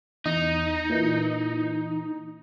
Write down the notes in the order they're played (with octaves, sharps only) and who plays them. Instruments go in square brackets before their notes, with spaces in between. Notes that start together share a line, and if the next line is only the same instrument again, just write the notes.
[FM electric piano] E2 D#5 [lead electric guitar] D#4
[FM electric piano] A#2 E3